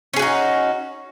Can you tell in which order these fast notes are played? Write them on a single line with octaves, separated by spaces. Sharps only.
C#4 G#4 F#4 D#4